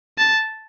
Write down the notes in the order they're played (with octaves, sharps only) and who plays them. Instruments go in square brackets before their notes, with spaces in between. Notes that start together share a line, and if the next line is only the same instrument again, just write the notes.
[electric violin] A5